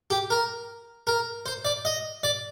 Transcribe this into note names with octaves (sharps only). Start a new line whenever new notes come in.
G4
A#4
A#4
C5
D5
D#5
D5